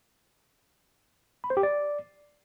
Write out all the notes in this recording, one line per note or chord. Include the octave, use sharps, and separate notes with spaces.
B5
C5
G4
D5